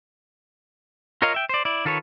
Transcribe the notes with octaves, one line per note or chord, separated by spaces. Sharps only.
F4 A#4 C#5 D#5 F5
E5 G5
C5 D5
E4 D5
D#3 F4 A4 B4 C#5